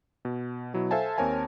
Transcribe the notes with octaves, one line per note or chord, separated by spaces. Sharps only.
B2
B2 F#3 E4
A4 C5 E5 F5 G#5 A5
D#2 C4 A#4 C#5 G#5 A5